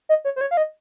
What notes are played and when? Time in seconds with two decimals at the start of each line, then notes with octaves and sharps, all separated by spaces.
0.09 D#5
0.25 C#5
0.36 C5
0.41 C#5
0.51 F5
0.57 D#5